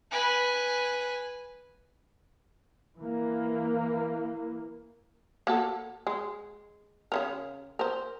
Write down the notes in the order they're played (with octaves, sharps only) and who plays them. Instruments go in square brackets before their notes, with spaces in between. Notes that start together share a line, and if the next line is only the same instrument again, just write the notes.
[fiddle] B4 G#5
[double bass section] E3 A#3
[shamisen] A#3 F#4 A4
G#3
C#3 E3 A#4
A#4 C5